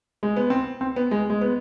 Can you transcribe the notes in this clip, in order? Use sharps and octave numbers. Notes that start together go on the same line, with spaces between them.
G#3
B3
C4
C4
B3
G#3
G#3
B3